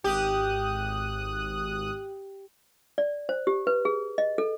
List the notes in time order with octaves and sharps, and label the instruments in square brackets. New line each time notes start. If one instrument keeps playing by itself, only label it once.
[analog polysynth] G#1 D#6 F#6 [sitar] G4
[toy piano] D5
C5
G4
B4
G#4
D#5
A4